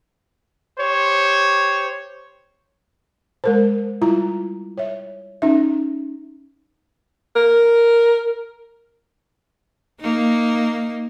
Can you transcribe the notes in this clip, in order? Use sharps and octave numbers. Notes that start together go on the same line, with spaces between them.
G4 C5 C#5
G#3 A#4 C5
G3 E4 F4 A#5
C#5 E5
C#4 D#4 E5
A#4
A#3 D#4